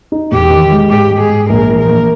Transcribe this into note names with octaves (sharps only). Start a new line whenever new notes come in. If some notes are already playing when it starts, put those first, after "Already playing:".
D#4
E1 G4
D#3
G#3
G#2 G4
G#3
G#4
G#2
A#1 A#4
E3
A#4
A#1